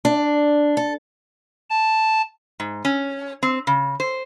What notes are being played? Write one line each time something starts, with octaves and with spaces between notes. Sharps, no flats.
D4
A4
A5
G#2
C#4
C4
C#3
C5